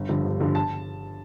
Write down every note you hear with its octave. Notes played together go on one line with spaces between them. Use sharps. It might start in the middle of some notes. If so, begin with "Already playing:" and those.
Already playing: G1
G2 D3 F3
G1
G2 D3 F3
A5